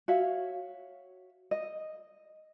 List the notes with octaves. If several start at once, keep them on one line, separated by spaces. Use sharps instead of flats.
F#4 C#5 E5 F5
D#5